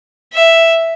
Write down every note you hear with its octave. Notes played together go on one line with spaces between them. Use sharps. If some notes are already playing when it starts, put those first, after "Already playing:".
E5